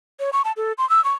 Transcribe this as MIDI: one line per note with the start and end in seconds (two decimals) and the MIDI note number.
0.20 0.30 73
0.33 0.42 85
0.45 0.52 81
0.57 0.73 69
0.78 0.88 84
0.90 1.03 88
1.04 1.13 85